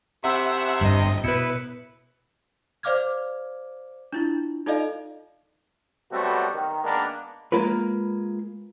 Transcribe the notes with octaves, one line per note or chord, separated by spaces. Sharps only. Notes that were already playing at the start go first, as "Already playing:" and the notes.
C3 E5 F#5 E6
G1 G2 D#5
B2 E4 B4 C#7
C5 D5 F5 D6 F6 G#6
D4 E4 F4
D#4 F4 A4 D5 D#5 F5
B2 F#3 G3 A3 C4 F#4
D#3
D#3 G#3 A#3 B3 D4
G#3 A#3 F4 A#4 B4